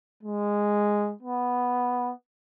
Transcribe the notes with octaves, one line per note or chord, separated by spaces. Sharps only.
G#3
B3